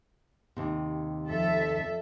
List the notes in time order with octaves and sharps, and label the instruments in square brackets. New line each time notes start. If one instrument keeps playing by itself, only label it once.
[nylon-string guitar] D#2 C3
[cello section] F2 A4 E5